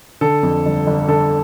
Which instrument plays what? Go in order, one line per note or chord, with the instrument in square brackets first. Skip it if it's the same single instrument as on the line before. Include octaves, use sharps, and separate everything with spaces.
[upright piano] D3 A4
F2
G1
G1
D3 A4